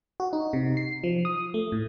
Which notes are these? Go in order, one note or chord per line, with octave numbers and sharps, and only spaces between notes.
F#4
D#4
C3
C7
F3
D#6
A3
A2